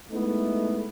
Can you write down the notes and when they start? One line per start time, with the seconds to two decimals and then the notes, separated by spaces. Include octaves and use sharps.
0.12 G#3 A3 B3 D#4 E4